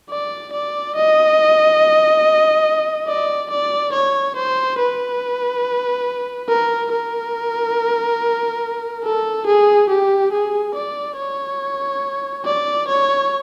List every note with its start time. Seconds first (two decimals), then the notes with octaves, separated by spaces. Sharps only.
0.10 D5
0.53 D5
0.95 D#5
3.08 D5
3.51 D5
3.93 C#5
4.36 C5
4.79 B4
6.49 A#4
6.92 A#4
9.04 A4
9.47 G#4
9.90 G4
10.32 G#4
10.75 D5
11.17 C#5
12.45 D5
12.88 C#5